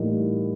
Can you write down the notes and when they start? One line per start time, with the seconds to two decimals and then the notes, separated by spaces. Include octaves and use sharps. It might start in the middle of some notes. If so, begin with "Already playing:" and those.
Already playing: A2 E3 G3 A#3 D#4